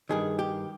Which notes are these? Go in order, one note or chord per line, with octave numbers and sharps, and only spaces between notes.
G2 D#3 G#4
G4